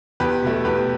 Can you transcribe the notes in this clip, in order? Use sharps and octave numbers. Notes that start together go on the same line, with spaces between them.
E2 G4 B4
B2 A3
E2 G4 B4